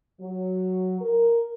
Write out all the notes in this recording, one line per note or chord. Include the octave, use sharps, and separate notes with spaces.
F#3
A#4